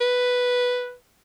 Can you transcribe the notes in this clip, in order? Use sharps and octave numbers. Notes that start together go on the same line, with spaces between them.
B4